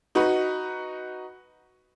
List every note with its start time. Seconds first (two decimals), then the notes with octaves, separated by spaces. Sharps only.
0.15 D#4 F#4 B4